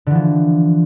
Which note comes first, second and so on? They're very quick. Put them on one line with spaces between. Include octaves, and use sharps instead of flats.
D3 E3 F3